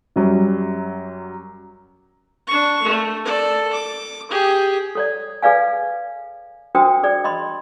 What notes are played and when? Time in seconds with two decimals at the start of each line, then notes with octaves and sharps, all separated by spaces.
0.16 F#2 F#3 G3
2.47 D4 C#6
2.82 A3
3.25 A4 D5
3.73 D6
4.30 G4 G#4
4.95 A4 C#5 D5
5.42 G#4 B4 D5 F5 G#5
6.75 D4 F#4 A#4 C5 G5 D#6
7.03 G#4 D5
7.24 D#5 B5 C6